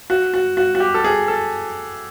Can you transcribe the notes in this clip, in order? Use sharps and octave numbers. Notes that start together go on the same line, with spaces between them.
F#4
F#4
F#4
F#4
G4
A4
G#4
A4